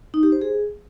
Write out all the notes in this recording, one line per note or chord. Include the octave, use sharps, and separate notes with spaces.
D#4
G4
C5
G#4